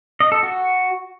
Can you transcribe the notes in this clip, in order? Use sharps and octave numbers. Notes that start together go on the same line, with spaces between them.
D#5
A4
F#4